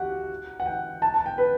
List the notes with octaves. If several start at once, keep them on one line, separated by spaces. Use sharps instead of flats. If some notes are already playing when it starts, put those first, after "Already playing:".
Already playing: F#4 G4 F#5
F#5
G5
A5
A5
G5
B4